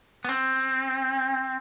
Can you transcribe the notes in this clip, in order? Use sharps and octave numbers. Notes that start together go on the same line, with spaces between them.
B3
C4